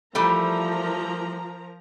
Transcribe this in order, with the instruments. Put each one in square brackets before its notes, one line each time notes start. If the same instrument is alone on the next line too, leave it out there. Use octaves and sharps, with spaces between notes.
[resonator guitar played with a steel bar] E3 G3 A3 [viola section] F3 A#4 A#5